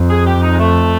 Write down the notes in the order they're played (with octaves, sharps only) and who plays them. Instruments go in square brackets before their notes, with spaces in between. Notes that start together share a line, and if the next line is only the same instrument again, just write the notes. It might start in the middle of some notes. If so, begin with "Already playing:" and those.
Already playing: [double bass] F2
[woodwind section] G#4
G4
D#4
G#3
A3